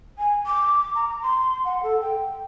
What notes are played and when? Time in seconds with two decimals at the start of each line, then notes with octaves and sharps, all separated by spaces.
0.18 G#5
0.46 D6
0.95 A#5
1.22 C6
1.65 F#5
1.83 A4
2.00 G5